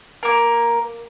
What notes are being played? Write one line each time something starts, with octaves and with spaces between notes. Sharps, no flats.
A#3 A#4